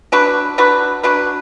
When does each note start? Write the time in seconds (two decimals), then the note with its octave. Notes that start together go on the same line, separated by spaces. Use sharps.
0.12 F#3 D4 F#4 B4
0.58 F#3 D4 F#4 B4
1.03 F#3 D4 F#4 B4